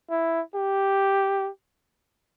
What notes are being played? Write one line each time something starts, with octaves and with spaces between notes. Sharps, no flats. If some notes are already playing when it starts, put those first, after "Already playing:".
E4
G4